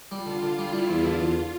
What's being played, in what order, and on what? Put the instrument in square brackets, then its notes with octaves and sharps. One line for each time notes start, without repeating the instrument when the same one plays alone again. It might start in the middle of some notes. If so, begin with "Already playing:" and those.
[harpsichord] G3 [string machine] F4
[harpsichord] D3
D3
[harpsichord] G3 [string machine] E4
[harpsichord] G3
E2
[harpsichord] D3 [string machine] F4
[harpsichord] E2